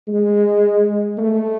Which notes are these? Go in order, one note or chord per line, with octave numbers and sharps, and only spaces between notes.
G#3
A3